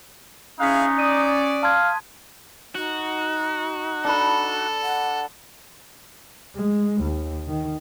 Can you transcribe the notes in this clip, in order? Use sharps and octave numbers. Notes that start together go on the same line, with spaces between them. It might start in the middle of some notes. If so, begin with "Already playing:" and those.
C#4 D#4 E4 G#4 F5 F#6 B6
D5 D#6 D#7
F5 A5 C6 G#6
D#4 F#4
D4 A4 B5
F#5
G#3
D#2
D#3